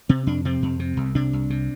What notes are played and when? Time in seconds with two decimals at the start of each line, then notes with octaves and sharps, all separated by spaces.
0.09 C3 C4
0.27 F2 D4
0.45 C3 C4
0.62 F2
0.79 C3
0.97 C2
1.15 C3 D4
1.33 C2
1.50 C3